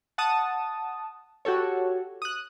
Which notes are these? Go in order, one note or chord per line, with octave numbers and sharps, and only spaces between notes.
F#5 A5 D#6
F#4 G4 A4 C#5
D#6 F#6